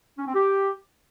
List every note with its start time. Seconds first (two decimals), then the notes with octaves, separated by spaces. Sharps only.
0.18 C#4
0.26 C4
0.34 G4